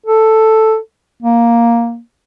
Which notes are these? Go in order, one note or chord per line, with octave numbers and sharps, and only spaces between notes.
A4
A#3